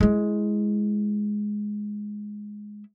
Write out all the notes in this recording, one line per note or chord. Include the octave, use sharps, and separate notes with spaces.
G#3 E4